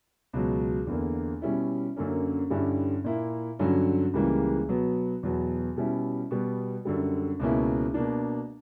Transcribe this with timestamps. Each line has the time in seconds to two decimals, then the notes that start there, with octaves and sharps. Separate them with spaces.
0.33 C#2 B2 F#3
0.87 E2 D3 A#3
1.42 B2 G3 C#4 E4
1.96 F#2 D3 A#3 C#4
2.50 G2 D3 G3 C#4 E4
3.04 A#2 A#3 E4
3.59 G2 D3 F#3 C#4
4.14 C#2 C#3 E3 G3 A#3
4.69 B2 F#3 B3
5.23 E2 B2 F#3 B3
5.76 B2 G3 C#4 E4
6.31 B2 G3 B3
6.85 F#2 D3 G3
7.40 C#2 B2 A#3 C#4 E4
7.94 B2 A#3 D4